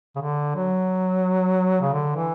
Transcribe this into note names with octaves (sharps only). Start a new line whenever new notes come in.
C#3
D3
F#3
C#3
D3
E3